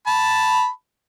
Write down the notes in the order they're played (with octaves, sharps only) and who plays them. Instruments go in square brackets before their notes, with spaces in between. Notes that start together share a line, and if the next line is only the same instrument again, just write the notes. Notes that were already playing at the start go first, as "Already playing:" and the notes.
[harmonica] A5 B5